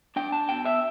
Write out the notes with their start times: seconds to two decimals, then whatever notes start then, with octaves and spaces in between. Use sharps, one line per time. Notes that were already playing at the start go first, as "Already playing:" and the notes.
0.16 D4 G5
0.32 A5
0.49 B2 G5
0.65 E5